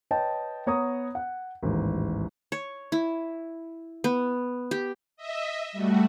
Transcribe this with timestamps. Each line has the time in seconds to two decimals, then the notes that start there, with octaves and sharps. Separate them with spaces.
0.11 B4 C#5 D#5 G5 A5
0.67 B3 C#5 A#5 D#6
1.15 F#5
1.63 A1 D#2 G#2
2.52 C#5
2.92 E4
4.04 B3
4.71 G4
5.17 D#5 E5
5.72 G3 A3 F#4